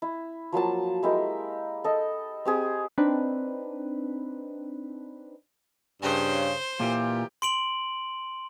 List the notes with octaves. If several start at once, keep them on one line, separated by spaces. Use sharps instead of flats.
E4
F3 F#3 A#3 A5
G#3 E4 G4 A#4
A4 D#5
C4 G4 G#4 C5
C4 D4 D#4 B4
G2 C#3 C5
A#2 E3 F4 G4
C6 D7 F#7